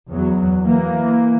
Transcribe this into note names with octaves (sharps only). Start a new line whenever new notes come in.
E2 F#3
E3 A#3